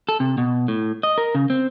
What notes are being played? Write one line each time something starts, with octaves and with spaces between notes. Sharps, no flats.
A4
C3
B2
A2
D#5
A#4
C#3
C4